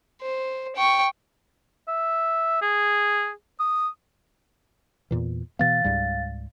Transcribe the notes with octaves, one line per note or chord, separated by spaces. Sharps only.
C5
G5 C#6
E5
G#4
D#6
E2 A#2 E3
B2 E3 B3 F5 A6
C#2 G#2 G3